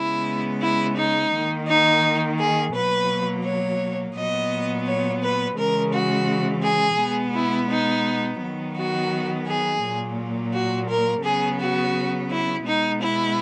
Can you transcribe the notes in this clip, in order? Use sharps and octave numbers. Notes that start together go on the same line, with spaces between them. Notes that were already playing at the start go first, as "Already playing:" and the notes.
Already playing: C#3 G#3 B3 E4
E4
D#4
D#3 A#3
D#4
G#4
B2 F#3 A#3 B4
C#5
A#2 F#3 B3 D#5
C#5
B4
C#3 E3 G#3 A#4
F#4
G#4
B2 G#3 B3
E4
D#4
D#3 F#3 B3
F#4
G#4
A#2 F#3 A#3
F#4
A#4
C#3 F#3 B3 G#4
F#4
E4
B2 G#3 B3 D#4
E4